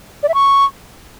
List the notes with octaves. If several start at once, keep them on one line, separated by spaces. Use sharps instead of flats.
D5
E5
C#6